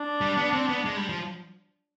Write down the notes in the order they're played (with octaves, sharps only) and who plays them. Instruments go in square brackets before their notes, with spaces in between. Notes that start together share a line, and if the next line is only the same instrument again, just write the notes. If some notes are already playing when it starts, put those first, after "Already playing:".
Already playing: [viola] D4
[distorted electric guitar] G3
B3
C4
B3
G#3
G3
F3